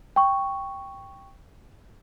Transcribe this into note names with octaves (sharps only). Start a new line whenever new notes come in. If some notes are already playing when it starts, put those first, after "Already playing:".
G5 C#6